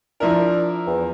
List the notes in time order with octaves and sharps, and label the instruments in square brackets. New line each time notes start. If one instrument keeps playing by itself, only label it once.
[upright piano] F3 E4 A#4 [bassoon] D4
[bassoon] E2